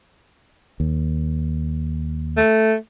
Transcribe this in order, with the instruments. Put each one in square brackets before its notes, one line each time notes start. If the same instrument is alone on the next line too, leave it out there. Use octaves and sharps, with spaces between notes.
[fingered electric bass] D#2
[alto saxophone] A3